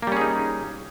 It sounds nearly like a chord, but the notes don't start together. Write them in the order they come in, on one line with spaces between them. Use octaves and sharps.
A#3 G3 C#4 G#4 D#4